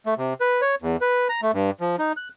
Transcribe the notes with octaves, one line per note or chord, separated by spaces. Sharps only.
A3
C3
B4
C#5
E2
B4
A#5
A3
G2
F3
D#4
F#6